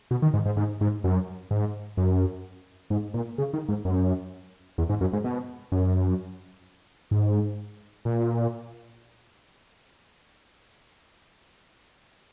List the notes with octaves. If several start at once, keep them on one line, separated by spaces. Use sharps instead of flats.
B2
D#3
G#2
G#2
G#2
G#2
F#2
G#2
F#2
G#2
A#2
C#3
D#3
G#2
F#2
E2
G#2
F#2
G#2
B2
F#2
G#2
A#2